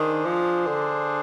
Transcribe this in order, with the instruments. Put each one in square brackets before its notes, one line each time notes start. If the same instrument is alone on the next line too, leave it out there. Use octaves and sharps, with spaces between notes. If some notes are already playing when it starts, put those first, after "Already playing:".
Already playing: [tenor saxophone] D#3 [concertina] D4 G#4 C5
[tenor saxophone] F3
D3